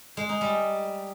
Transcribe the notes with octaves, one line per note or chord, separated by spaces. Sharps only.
G#3
D#4
G3